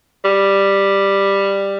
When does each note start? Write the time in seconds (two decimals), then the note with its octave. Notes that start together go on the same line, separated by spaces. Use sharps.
0.25 G3